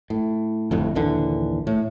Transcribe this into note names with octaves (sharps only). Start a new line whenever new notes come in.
A2
G1 F2 A2
A#1 D#2 D3 E3
A2